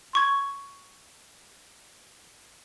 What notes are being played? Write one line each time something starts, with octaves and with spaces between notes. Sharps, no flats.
C6 C#6 G#6